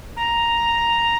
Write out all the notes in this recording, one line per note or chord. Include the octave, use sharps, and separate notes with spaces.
A#5